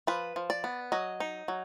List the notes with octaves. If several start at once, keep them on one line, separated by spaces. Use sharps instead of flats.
F3 B4
F3
D5
B3
F#3 D#5
D#4
F#3